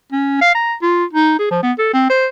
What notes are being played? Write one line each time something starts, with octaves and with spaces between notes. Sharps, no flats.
C#4
F5
A#5
F4
D#4
G#4
F3
B3
A4
C4
C5